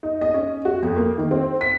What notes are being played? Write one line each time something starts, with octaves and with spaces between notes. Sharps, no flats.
D#4
D#5
C#4
F#4
F2
A#3
D#3
C4
B6